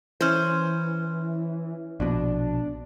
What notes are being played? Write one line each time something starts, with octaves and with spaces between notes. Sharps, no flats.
E3 C#4 C5
A#1 B2 D4